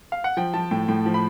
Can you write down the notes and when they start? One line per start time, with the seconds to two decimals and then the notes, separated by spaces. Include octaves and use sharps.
0.12 F5
0.24 F#5
0.37 F3 G5
0.54 F3 A5
0.71 A2 G5
0.88 A2 G5
1.06 F3
1.14 B5